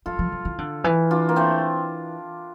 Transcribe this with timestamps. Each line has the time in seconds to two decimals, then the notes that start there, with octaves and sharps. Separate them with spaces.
0.06 F3 F4 A4
0.19 F3
0.32 F3
0.45 E3
0.58 D3
0.84 E3
1.11 D4 F4
1.29 A#3
1.36 A3 C4